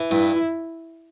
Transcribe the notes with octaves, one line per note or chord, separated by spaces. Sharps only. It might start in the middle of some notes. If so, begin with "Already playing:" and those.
Already playing: E3
G2 E4